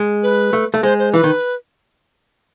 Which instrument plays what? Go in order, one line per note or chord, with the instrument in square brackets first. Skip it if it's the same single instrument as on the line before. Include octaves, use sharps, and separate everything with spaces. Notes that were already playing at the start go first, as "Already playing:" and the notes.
Already playing: [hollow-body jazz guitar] G#3
[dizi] B4
[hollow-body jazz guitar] A3
A3
[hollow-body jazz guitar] G#3 [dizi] C5
[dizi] C5
[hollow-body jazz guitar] E3 [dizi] B4
[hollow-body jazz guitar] D#3